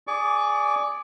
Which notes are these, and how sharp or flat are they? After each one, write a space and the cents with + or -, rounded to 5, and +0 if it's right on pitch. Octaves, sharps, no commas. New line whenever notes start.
G#4 +0 D5 +0 C#6 +45